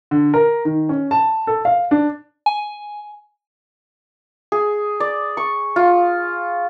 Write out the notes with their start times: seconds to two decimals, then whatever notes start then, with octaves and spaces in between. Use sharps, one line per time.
0.11 D3
0.34 A#4
0.65 D#3
0.89 C#4
1.11 A5
1.47 A4
1.65 F5
1.91 D4
2.46 G#5
4.52 G#4
5.00 D5
5.37 C#6
5.76 F4